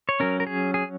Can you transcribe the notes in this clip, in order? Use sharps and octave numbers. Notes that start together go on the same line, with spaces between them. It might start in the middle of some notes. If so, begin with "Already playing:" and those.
C#5
F#3 C#4 A#4
A#4
G#4
G#4